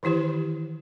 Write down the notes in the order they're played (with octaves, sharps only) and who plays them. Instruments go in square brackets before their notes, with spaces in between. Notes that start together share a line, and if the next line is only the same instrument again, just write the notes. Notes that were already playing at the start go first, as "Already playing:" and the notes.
[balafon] D#3 E3 E4 G4 C5